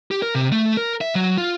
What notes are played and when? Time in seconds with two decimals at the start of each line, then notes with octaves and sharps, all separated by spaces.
0.11 G4
0.22 A#4
0.35 C3
0.52 A3
0.77 A#4
1.01 E5
1.15 F#3
1.38 F4